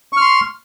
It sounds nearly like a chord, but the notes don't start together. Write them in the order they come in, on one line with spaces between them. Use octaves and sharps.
C#6 F6 C6